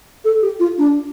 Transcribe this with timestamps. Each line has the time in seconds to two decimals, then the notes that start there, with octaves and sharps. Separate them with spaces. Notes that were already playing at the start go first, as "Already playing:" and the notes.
0.24 A4
0.41 G4
0.59 F4
0.78 D4